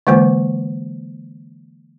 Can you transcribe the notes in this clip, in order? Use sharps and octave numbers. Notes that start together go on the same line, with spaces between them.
D3 E3 G#3 A#3 C5